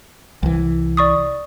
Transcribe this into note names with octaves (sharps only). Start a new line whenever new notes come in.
C2 E3
D5 C#6 D#6